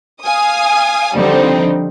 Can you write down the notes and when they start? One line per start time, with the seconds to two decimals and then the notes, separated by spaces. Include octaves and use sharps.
0.23 F5 G#5 D#6
1.15 D3 F3 G3 C4 D#4